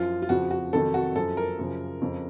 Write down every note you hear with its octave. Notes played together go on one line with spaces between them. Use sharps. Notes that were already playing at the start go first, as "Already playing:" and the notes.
Already playing: F#2 F3 F4
F4
F2 C#3 F3 F#4
F#4
F2 C3 D#3 F#3 A4
F#4
F#2 F3 A4
A#4
F#2 C#3 F3
F2 C#3 F3